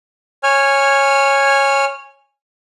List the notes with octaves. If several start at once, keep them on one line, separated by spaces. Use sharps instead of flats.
C#5 G#5 F6